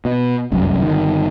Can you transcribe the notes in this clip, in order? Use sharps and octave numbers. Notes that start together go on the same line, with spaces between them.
B2
F1 C2 F#2
G1 D#3